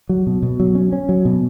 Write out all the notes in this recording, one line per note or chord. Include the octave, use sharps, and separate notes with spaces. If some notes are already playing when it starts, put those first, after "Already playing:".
F#3
B2
B2
F#3
C#4
C#4
F#3
B2